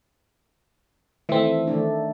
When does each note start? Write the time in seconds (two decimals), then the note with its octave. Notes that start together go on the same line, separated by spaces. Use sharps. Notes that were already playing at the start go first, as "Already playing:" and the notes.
1.29 D#3 E3 A3 C4 E5
1.67 D#3 A3 D4